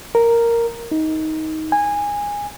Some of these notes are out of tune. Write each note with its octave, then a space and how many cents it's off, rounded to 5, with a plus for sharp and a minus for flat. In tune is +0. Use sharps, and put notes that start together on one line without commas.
A#4 -5
D#4 +15
G#5 -15